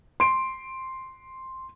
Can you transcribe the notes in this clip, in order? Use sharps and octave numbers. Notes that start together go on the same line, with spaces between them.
C6 D7